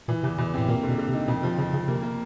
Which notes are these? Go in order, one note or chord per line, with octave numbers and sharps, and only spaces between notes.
A#2 E3
E2 C3
E2 B2
A2 C3
A#2 A#3
B2 D3
D3
C3
D#4
F2 B2
C3 F3
F2 C#3
F2 C#3
C3 A#3
A#3